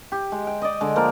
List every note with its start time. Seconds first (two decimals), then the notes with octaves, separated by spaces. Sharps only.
0.12 G4
0.32 G#3
0.47 G5
0.62 D5 D#5
0.81 D3 G#3
0.96 F3 A#3 A#4